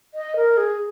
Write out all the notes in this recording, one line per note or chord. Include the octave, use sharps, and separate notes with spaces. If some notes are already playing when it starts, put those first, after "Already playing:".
D#5
A#4
G#4